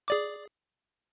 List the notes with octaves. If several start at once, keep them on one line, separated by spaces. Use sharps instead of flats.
G#4 D5 D6